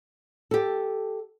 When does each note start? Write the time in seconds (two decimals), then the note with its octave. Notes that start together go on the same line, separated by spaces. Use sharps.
0.51 G4 A4